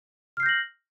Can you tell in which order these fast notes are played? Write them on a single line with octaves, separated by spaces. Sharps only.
F6 C7 G6 A#6 F#7